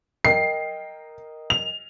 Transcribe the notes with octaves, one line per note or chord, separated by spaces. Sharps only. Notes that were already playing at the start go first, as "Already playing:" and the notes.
A#4 D#5 G5 C7
F7